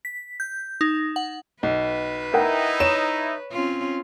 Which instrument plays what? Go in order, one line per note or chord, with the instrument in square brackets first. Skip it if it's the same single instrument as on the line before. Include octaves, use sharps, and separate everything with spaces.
[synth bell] B6
G6
D#4
F#5
[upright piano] B1 [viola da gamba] B4
[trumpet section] D#4 E4 [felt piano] A#4 F#5 G5
[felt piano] C#5 [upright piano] E7
[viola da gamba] C4 C#4 F4